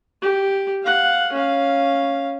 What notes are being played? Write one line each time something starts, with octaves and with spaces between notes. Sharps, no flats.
G4
F5 F#5
C#4 F5